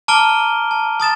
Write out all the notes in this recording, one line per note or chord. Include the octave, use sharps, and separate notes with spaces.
A5 A#5 D6 F6 D7 G7
A5
A5 D#6 A6 E7